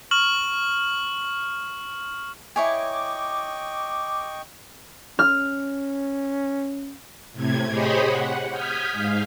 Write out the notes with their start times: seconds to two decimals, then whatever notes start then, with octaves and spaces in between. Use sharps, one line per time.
0.11 C#6 F6 F#7
2.56 E4 C#5 D#5 G5 G#5 C#6 D6
5.19 C#4 F6
7.33 A2 C3 G#6
7.69 G4 G#4 C5 C#5 D#5 B5
8.04 F#5
8.50 D#6 F6 G6 G#6 B6
8.92 G#2 F5